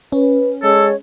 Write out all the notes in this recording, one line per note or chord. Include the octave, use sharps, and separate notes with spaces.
C#4 B4
G#3 A4 C#5